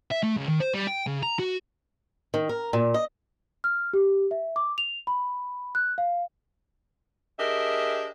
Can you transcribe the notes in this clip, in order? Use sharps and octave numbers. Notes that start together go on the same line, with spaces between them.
E5
A3
C#2
D#3
C5
G3
G5
C#3
A#5
F#4
D#3
A#4
A#2
D#5
F6
G4
E5
D6
F7
B5
F#6
F5
D4 G4 G#4 A#4 D#5 E5